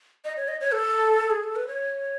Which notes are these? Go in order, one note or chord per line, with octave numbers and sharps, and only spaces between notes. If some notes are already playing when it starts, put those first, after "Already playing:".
D#5
C#5
D#5
C#5
A4
G#4
A4
B4
C#5